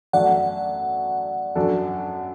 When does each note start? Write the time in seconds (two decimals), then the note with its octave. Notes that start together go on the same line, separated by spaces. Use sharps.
0.13 F#2 F#3 A3 D5 F#5
1.55 F#2 F#3 D4 A4